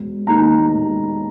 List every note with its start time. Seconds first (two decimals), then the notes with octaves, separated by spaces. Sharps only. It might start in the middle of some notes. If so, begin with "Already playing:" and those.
Already playing: E1
0.27 D#2 D#3 A#3 D#4 A#5
0.74 E1